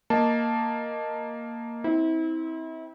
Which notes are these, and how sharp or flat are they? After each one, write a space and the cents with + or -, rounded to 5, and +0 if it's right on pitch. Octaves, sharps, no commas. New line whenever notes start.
A#3 +0 D#5 +0 A5 +0
C4 -5 E4 -35